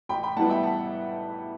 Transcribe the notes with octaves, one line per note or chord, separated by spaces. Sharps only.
A1 G5 B5
G5 B5
A2 E3 G3 B3 F#5 A5
E5 G5
F#5 A5